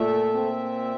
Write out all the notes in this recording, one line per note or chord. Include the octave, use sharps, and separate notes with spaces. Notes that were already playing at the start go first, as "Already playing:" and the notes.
Already playing: A#2 A3 E5
C4